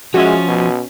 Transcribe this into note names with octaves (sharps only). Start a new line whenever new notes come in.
F3 G#3 C#4 F#4 E5
B2